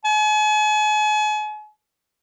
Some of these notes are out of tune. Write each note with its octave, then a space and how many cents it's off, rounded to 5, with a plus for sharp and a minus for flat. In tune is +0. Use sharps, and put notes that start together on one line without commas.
G#5 +40